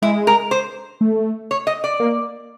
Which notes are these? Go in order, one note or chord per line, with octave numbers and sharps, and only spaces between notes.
G#3 E4
A#4
C5
A3
C#5
D#5
D5
A#3